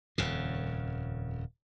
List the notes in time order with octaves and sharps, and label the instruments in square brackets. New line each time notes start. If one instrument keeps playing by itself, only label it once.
[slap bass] D#1 F2 C#3